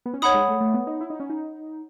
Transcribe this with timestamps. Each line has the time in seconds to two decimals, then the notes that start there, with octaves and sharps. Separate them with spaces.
0.06 B3
0.14 C#4
0.22 D#4 C#5 F#5 B5 D#6
0.34 G#3
0.48 A3
0.61 A3
0.74 B3
0.87 D#4
1.01 E4
1.10 D#4
1.20 C#4
1.30 D#4